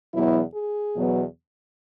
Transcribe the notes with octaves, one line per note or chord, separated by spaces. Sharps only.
E2 B2 F#3 B3 E4
G#4
E2 B2 F#3 B3